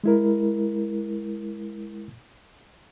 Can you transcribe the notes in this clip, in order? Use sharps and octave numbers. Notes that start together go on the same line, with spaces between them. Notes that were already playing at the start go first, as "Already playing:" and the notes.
G#3 E4 A#4